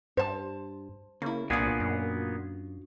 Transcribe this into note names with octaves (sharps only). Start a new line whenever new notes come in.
G2 C5 A5
C#3 A#3 E4
C2 A#2 B3 D4 F4 F#4 G#4
F#2